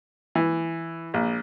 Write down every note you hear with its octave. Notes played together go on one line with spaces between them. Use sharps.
E3
A#1